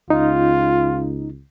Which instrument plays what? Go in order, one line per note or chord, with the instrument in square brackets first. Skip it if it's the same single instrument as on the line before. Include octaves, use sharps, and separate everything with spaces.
[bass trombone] C#2 [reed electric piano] D#4 [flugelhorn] F4